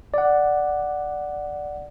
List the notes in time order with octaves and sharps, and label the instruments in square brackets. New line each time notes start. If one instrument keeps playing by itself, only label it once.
[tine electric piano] D5 F#5